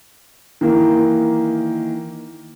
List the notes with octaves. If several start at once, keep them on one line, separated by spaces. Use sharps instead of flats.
D#3 E3 A#3